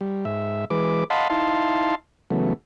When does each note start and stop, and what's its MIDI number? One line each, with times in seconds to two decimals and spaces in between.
0.01 0.25 55
0.25 0.65 44
0.25 0.65 76
0.70 1.04 52
0.70 1.04 56
0.70 1.04 71
0.70 1.04 86
1.10 1.28 75
1.10 1.28 77
1.10 1.28 78
1.10 1.28 81
1.10 1.28 83
1.10 1.28 84
1.30 1.95 63
1.30 1.95 64
1.30 1.95 77
1.30 1.95 81
1.30 1.95 84
2.30 2.53 49
2.30 2.53 52
2.30 2.53 54
2.30 2.53 57
2.30 2.53 59